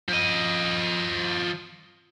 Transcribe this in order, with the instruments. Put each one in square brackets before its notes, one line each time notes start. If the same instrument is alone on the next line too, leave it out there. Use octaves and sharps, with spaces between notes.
[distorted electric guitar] F3 D#5